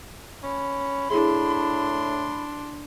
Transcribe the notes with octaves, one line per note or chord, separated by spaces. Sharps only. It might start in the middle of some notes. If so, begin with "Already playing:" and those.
C#4 B5
A2 D4 E4 G#4 C6